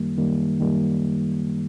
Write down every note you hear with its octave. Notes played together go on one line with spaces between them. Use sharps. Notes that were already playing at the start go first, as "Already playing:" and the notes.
Already playing: F#2 D#3 G3 A#3
F#2 D#3 G3 A#3
F#2 D#3 G3 A#3